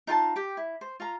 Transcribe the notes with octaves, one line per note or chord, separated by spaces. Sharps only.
D#4 F4 F#5 A5
G4 G5
E4
C5
F4 F5 A#5